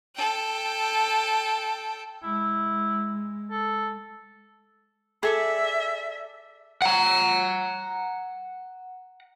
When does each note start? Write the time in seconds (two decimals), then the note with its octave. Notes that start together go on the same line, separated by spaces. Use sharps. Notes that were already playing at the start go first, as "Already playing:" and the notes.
0.15 A4 G5
2.23 G#3 E4
3.51 A4
5.23 G#4 A4 D5 E5
6.82 F#5 A#5